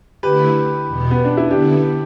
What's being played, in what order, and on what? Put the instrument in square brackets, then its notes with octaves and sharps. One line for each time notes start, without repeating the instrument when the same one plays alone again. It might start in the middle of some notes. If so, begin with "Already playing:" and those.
[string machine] D3 A3 E4 [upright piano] G4 B4
[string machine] E2 B2 B3
[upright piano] B3
D4
E4
[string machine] D3 B3 E4 [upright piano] D4 G4